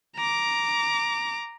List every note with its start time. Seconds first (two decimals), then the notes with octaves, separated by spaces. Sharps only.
0.16 A#5 D6